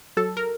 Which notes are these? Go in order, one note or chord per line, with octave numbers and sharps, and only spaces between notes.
F#3 A4
A#4